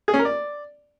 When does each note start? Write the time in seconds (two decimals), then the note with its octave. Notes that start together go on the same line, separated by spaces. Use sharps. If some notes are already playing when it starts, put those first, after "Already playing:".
0.08 G#4
0.14 C#4
0.19 A#4
0.25 D5